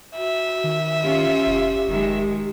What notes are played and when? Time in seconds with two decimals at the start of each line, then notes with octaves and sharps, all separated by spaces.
0.16 F#4 E5
0.64 D#3
1.03 C#4 F4 G4
1.46 F1
1.87 F1 D#3 G#3